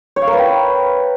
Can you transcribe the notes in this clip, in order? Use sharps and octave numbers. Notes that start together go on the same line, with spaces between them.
C#5
F5
A#4
B4
G5